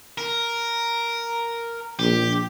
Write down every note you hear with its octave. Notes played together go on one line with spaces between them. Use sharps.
A#4
A#1 G4